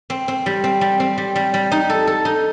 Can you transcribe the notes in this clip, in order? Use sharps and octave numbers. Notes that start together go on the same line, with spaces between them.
C4
C4
G3
C4
G3
C4
G3
G3
G3
D#4
A4
A4
D#4